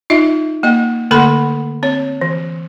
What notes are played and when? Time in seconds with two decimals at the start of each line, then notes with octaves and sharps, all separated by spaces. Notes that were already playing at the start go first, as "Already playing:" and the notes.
0.10 D#4 F4 D#5 E5
0.63 A#3 D#5 G5
1.11 D3 A3 A#3 A4 F#5 B5
1.83 C4 C#5
2.21 E3